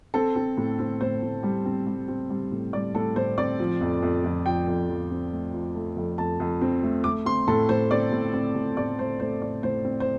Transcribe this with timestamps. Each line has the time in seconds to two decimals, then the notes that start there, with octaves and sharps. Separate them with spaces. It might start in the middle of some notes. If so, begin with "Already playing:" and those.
0.14 C4 A4
0.36 C4
0.57 A2
0.79 C4
1.01 A2 C5
1.22 A2
1.43 G3
1.65 C4
1.87 G3
2.08 C4
2.30 G3
2.52 A2
2.73 G3 D5
2.95 A2 A4
3.16 A2 C5
3.38 C4 D5
3.59 F3
3.81 F2
4.02 F2
4.24 F2
4.46 F3 G5
4.68 F2
4.89 F3
5.11 C4
5.32 A3
5.53 F3
5.75 A3
5.97 F2
6.18 F2 A5
6.40 F2
6.61 C4
6.83 A3
7.04 A3 D6
7.26 C4 C6
7.48 A2 A4
7.69 A2 C5
7.91 C4 D5
8.12 A2
8.34 C4
8.55 A2
8.77 A2 D5
8.99 A3 C5
9.20 A3 C5
9.42 A2 D5
9.63 A2 C5
9.85 C4
10.00 C5